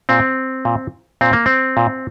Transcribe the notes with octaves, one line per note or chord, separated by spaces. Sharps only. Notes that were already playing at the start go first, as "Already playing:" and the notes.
A#2 C4
A#2
A#2 C4
A#3
C4
A#2